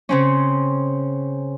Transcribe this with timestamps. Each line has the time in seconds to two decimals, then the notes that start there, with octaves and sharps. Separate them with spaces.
0.09 C#3 C4 C#4